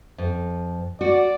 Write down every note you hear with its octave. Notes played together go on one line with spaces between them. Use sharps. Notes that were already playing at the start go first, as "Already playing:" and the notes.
F2
F#4 D5